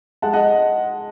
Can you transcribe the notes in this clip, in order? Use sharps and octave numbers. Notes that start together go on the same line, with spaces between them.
G#3 F#5 A5
D#5 F#5